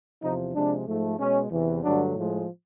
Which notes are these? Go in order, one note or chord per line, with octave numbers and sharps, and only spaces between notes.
E2 C3 F3 D#4
C3 F3 G#3 D4
G#2 F3 A3
B2 G#3 C#4
E2 C3 E3
G2 D3 F#3 A3 D4
A2 F3 G#3